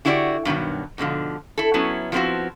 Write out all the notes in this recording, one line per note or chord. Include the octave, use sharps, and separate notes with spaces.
D3 E4 F#4 G4 C5 D5
G2 B2 D#3 F#3
G#2 B2 D3 F3
E4 A4
F#3 B3 C#4 E4
F3 F#3 B3 C4 E4 F#4